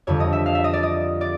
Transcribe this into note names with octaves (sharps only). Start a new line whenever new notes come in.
F2 D3 G3 C#5
D#5
E5
F5
E5
D#5
D5
D#5
D5